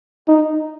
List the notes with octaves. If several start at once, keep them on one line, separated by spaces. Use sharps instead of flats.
D#4